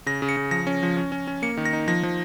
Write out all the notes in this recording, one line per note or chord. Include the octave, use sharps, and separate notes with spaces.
C#3 A#6
C#3
C#7
C#3
F3 A#6
C#4
F3
C#4
C#4
C#4
A#3 C#7
D#3
A#6
D#4
F3 A#6
F3